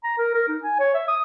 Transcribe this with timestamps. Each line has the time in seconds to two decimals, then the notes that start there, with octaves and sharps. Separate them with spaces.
0.04 A#5
0.18 A#4
0.35 A#4
0.48 D#4
0.63 G#5
0.79 C#5
0.94 E5
1.08 D#6